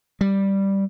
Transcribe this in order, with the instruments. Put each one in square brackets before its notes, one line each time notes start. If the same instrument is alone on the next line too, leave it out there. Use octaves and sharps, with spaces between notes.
[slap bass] G3